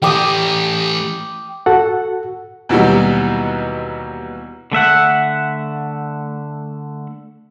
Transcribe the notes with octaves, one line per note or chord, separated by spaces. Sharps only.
E3 A3 G4 G5 D6 D#6
F#4 A4 F#5
D#2 B2 E3 F#3 G3
D3 A3 E5 F#5